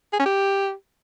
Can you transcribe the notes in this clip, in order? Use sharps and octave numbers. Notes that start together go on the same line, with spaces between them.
G#4
C#4
G4